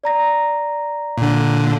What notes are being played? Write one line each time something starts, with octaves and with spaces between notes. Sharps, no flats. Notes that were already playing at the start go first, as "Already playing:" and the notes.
D5 A#5 A#6
A#2 D3